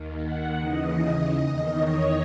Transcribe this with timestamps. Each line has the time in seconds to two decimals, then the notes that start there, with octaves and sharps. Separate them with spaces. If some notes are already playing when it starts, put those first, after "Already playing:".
Already playing: D#2 D#3
0.21 F#5
0.59 D#2 C#3 E3 D#5
1.34 E2 D#3 D#5
1.72 C#5